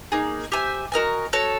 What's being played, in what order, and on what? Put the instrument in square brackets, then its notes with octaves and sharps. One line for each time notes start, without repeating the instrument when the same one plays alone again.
[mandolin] A#3 D#4 G#4
G4 C5 E5 G#5
F#4 A#4 D#5 G#5
F#4 A4 C#5